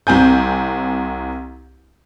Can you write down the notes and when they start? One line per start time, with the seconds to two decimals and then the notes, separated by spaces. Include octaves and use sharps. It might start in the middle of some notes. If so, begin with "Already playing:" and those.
0.07 C2 C4 G#5 G6